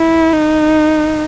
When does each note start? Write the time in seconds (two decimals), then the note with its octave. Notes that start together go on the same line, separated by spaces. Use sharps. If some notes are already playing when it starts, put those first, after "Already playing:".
Already playing: E4
0.34 D#4